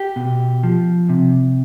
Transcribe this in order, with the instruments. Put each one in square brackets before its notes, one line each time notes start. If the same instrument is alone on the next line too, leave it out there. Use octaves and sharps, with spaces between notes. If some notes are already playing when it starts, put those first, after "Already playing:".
Already playing: [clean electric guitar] G4
B2
F3
C3